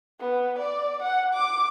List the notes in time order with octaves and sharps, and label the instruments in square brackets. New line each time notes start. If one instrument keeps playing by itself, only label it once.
[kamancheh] B3
D5
F#5
D6